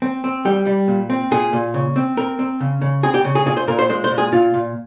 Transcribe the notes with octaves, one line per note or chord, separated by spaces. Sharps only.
C4
C4
G3 G4
G3
A#2
C4
A#2 G#4
A#2
C#3
C4
C4 A#4
C4
C#3
C#3
C4 G#4
G4
C#3
G#4
A#2 G#4
C5
A#2 A#4
C5
G#3 C5
C5
A#2
G#4
A#2 F4
A#2